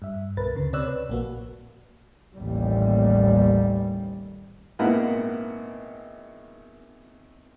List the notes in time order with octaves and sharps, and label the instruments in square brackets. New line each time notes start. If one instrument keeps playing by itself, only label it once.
[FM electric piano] G2 E5
C2 B2 A#4 B4 A6
D2 C#3
C3 C4 C#5 D5 E6 F#6
B4
A#1 A#3 F#4
[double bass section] A1 D#2 G3
[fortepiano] G#1 A#2 A#3 B3 E4 F#5